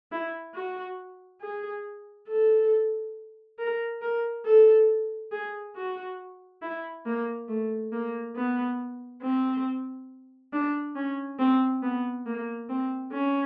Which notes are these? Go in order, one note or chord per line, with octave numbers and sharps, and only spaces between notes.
E4
F#4
G#4
A4
A#4
A#4
A4
G#4
F#4
E4
A#3
A3
A#3
B3
C4
D4
C#4
C4
B3
A#3
C4
C#4